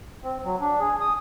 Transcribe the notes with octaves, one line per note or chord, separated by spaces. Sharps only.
C4
F#3
D4
G#4
D#6